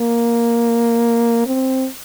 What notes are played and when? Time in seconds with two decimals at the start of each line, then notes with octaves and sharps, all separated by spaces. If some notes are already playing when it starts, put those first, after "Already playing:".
Already playing: A#3
1.47 C4